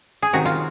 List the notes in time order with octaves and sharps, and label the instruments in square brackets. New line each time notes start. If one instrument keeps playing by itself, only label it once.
[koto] G#4
C3 D#3 F#3 F#4
F4